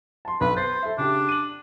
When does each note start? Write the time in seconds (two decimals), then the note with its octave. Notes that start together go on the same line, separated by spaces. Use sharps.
0.25 A5 C6
0.41 B1 B4
0.57 C5 A6 C7
0.83 A4 E5
0.98 C#3 D4 G4
1.29 D#7 F#7